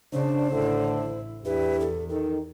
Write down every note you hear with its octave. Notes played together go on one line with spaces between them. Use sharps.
C#3 D4 C5
A1 A2 D3 E4
E2 D4 E4 G4 B4
A4
D#3 A4